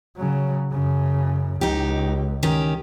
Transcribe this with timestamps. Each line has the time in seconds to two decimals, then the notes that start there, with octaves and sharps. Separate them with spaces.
0.17 C#3 F#3
0.72 F#2 C#3
1.61 C#2 D#4 G4
2.43 D#3 C#4 G4